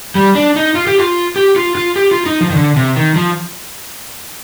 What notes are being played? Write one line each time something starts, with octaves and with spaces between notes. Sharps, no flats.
G3
D4
D#4
F4
G4
F4
G4
F4
F4
G4
F4
D#4
F3
D#3
D3
C3
D#3
F3